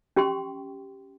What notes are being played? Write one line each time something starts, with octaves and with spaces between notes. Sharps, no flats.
C#4 G4 G5 C6 C#6